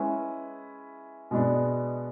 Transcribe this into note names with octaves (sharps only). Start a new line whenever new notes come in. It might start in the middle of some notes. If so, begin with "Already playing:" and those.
Already playing: G#3 C#4 E4 G#4 B4
B2 G#3 B3 D4